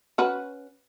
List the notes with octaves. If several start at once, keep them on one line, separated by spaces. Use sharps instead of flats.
C#4 F#4 B4